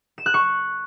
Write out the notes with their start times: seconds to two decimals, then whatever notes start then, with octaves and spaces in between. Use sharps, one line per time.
0.18 E7
0.26 F#6
0.34 C#6